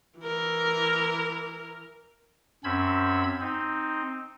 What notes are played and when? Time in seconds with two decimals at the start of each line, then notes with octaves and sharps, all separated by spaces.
0.19 E3 A#4
2.64 F#2 C4 C#4 B5 E6 G#6
3.41 C4 D#4